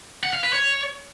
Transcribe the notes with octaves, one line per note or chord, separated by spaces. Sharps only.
F#5
F5
B4
C#5